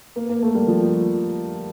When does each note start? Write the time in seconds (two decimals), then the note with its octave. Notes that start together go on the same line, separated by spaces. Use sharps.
0.16 A#3
0.29 A#3
0.42 A3
0.54 G3
0.68 F3